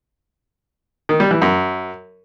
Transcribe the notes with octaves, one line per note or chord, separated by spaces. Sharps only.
D#3
G3
E3
F#2